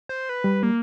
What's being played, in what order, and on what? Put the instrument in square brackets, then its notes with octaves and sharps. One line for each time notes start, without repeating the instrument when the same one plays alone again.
[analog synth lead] C5
B4
[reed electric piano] G3
[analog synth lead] A#3